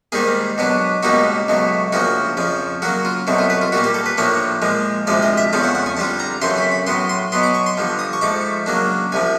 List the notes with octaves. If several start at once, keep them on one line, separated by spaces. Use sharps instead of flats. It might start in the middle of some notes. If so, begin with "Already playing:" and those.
G#2 D#3 G3 A#3 G#4
B2 F#3 B3 D4
C#2 B2 G3 A#3 D#4 F#4
C#2 B2 F#3 A3
D2 C#3 F3 A#3 F#4
F2 C#3 F3
C#3 F#3 A#3 F#4
F4
C2 B2 F#3 A3 C4
F4
B4
F4
A#2 G3 A#3 F#4
G4
A4
B4
A2 F3 A#3 D4 C#5
A#2 F3 G#3
D2 C3 F3 G#3 D5
D#5
E5
E2 C#3 F3 A3 C4 F5
F#5
F#5
G#5
D3 G3 C4 F4 A5
A#5
F#2 C#3 E3 A3 C4 C6
B5
B5
A2 F#3 B3 C6
C6
B2 F#3 B3 C6
D6
C#6
C6
G2 D3 F3
D#6
C#6
G#2 F3 A3 D6
C#3 F#3 A#3 D4
C2 C3 F3 G#5